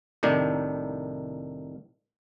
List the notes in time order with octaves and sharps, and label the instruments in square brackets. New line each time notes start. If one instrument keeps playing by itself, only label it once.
[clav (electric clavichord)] C2 A2 D#3 D4